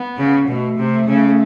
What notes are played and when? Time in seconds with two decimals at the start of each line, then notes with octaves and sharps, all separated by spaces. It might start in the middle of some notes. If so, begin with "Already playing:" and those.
Already playing: B3
0.17 C#3
0.47 B2 A3
0.78 C3
1.08 C#3